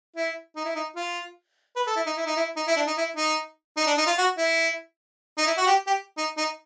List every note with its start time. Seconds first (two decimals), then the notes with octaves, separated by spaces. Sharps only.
0.16 E4
0.56 D#4
0.65 E4
0.75 D#4
0.96 F4
1.76 B4
1.87 A4
1.96 E4
2.06 D#4
2.17 E4
2.26 D#4
2.36 E4
2.56 D#4
2.67 E4
2.76 D4
2.87 D#4
2.97 E4
3.16 D#4
3.77 D#4
3.87 D4
3.97 D#4
4.07 F4
4.18 F#4
4.38 E4
5.38 D#4
5.47 E4
5.57 F#4
5.67 G4
5.87 G4
6.17 D#4
6.37 D#4